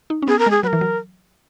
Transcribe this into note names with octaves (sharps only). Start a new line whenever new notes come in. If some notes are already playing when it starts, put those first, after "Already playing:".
D#4
C#4
B3 G#4
A#4
G#3 G#4
F#3 A#4 B4
E3
F#3